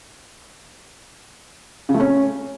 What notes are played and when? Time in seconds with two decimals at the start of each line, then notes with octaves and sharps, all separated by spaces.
1.89 C#3
1.94 A3
2.00 C#4